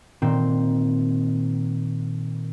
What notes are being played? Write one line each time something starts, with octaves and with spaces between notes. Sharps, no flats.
A#2 D#3 C4